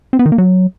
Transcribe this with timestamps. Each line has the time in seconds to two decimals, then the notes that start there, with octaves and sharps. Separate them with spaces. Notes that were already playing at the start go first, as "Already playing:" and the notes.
0.13 C4
0.19 B3
0.26 D#3
0.32 A#3
0.38 F#3